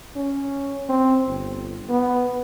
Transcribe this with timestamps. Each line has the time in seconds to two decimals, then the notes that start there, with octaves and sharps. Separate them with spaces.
0.16 C#4
0.89 C4
1.27 G1
1.89 B3